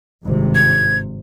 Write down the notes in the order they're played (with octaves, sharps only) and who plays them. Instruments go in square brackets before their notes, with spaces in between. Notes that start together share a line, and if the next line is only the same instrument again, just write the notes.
[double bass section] G#1 G2 C3
[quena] G#6